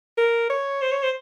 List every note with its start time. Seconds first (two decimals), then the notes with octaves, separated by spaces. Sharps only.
0.18 A#4
0.50 C#5
0.82 C5
0.92 C#5
1.03 C5